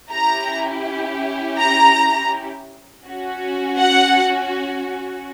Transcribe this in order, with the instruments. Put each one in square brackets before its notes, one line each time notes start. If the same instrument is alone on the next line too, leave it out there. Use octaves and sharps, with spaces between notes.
[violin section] C#4 E4 G4 A#5
A#5
C#4 F#4
F#5